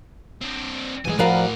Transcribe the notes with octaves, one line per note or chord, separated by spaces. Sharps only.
C4 D4
A2 E3 F3 G#3 G#5
F3 F#4 A#4 B4 D5 F5